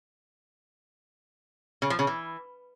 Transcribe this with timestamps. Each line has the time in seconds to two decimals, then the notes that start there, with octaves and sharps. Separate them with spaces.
1.82 C#3
1.90 F3
1.99 C#3
2.07 E3